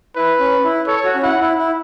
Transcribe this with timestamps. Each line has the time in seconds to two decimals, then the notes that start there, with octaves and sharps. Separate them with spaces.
0.16 E4 B4
0.40 C#4
0.64 E4
0.87 A4 C#5
1.05 F#4
1.15 C#4
1.23 E4 F#5
1.40 E4
1.59 E4